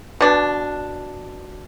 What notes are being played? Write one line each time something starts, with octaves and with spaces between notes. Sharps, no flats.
B2 D4